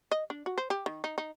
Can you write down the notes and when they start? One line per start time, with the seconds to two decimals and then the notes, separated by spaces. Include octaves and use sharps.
0.11 D#5
0.30 D4
0.46 F#4
0.58 C5
0.70 G4
0.86 D#3
1.04 D#4
1.18 D#4